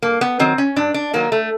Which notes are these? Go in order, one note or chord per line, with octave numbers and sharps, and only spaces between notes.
G2 A#3
B3
D#3 F#3 C4
C#4
G2 D4
D4
D#3 F#3 A#3
A3